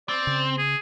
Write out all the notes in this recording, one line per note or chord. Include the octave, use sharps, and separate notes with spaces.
C4 D5
C#3
G#4